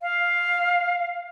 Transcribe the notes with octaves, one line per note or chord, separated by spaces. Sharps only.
F5